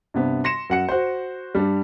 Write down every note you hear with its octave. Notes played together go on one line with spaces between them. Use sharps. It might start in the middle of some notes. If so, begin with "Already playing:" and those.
G2 C3 B3
C6 A#6 C#7 E7
F#2 F#5 C#7
F#4 C5
G2 G3